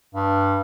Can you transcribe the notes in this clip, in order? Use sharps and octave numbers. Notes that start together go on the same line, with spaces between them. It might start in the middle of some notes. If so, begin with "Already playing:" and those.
G2